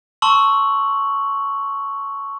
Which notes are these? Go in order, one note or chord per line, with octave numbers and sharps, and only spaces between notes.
A5 C6 C#6 E6 F#7